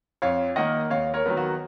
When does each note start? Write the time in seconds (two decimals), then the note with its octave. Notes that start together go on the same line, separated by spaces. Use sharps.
0.22 F2 C#5 F5
0.56 D#3 A#3 D#5 F#5
0.90 D#2 C#5 F5
1.14 A#4 C#5
1.26 D#3 F#3 B3
1.37 F#4